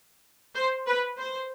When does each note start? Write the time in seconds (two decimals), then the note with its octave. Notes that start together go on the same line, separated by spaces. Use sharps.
0.54 C5
0.87 B4
1.18 C5